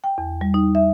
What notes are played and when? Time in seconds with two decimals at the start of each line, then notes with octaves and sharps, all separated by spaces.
0.04 G5
0.18 E2
0.41 G3
0.54 D#4
0.75 E5